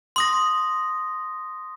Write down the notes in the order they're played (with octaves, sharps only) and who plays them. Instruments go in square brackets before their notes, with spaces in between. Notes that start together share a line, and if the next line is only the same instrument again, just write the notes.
[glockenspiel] C6 D#6 A#6